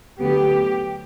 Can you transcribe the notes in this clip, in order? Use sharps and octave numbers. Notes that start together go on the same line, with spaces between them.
D2 D3 F#3 B3 G4